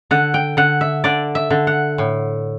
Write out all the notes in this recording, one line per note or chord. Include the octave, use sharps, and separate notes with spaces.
D3 F#5
G5
D3 F#5
E5
D3 D5
E5
D3
F#5
A2